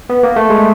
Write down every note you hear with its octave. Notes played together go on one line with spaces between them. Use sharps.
B3
A#3
A3
G#3